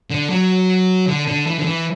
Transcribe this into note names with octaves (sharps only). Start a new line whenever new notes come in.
D3
F#3
D3
D3
E3
D3
E3